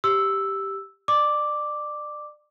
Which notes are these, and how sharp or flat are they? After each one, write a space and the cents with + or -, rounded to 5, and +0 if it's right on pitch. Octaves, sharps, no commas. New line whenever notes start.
G4 +0 E6 +0
D5 +30 D6 +0